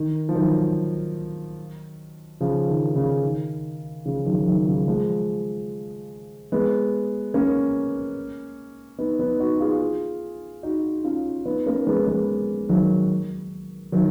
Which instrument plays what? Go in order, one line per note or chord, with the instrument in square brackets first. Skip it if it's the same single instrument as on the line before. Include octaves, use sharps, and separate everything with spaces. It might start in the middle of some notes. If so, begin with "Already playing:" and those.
Already playing: [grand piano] D#3
F3
D#3 F#3
C#3 F3
D#3
C#3
D#3
C#3 F3
D#3 F#3
D#3 F#3
C#3 F3
F3 G#3
G#3 B3
A#3 C#4
B3 D#4
B3 D#4
D#4 F#4
F4 G#4
D#4 F#4
C#4 F4
B3 D#4
A#3 C#4
G#3 B3
G#3 B3
D#3 F#3
D#3 F#3